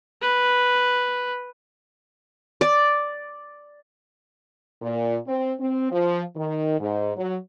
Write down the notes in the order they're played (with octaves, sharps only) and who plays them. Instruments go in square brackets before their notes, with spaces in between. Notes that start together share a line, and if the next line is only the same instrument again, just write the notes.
[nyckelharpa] B4
[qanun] D5
[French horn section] A#2
C4
C4
F3
D#3
G#2
F#3